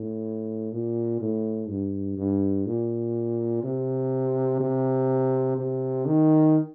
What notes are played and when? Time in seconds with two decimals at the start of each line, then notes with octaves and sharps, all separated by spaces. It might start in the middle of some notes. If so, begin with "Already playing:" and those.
Already playing: A2
0.73 A#2
1.21 A2
1.69 G2
2.18 G2
2.67 A#2
3.64 C3
4.61 C3
5.57 C3
6.06 D#3